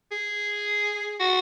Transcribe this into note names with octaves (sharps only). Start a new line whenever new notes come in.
G#4
F#4